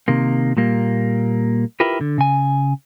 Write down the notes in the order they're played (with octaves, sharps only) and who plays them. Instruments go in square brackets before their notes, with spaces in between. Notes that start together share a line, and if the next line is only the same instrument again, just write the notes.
[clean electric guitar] C3 D#3 A#3
A#2 G3 A#3
E4 F4 G4 A#4 B4
D3
C#3 G#5